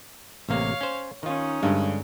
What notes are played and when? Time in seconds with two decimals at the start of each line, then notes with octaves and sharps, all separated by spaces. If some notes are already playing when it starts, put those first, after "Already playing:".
0.49 A1 C3 A#3 C#5 F5
0.81 C#4 C5
1.23 D#3 C#4 D#4 F4
1.63 G2 D3 G#3